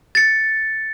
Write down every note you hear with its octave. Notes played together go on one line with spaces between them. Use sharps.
A6 C#7